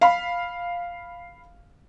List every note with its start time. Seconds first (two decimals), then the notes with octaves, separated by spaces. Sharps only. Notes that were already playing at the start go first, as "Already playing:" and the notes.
0.01 F5 B5